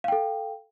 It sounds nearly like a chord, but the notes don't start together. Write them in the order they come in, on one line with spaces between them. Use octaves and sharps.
F5 G5 A4